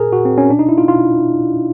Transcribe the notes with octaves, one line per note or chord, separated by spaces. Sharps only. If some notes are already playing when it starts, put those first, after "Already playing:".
Already playing: A#2 G#4 A#4
A#2 F#4
C4
C#4
B2 D4
D#4
E4
F4
B2 F4